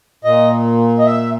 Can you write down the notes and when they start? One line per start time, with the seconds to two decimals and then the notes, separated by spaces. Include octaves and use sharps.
0.24 A#2 D#5
0.99 D#5
1.05 E5